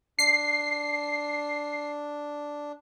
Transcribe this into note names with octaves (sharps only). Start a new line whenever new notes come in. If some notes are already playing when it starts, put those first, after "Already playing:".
D4 C7